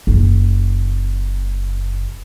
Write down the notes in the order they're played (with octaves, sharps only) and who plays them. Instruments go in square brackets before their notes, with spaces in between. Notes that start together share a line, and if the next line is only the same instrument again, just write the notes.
[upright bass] F#1 D#3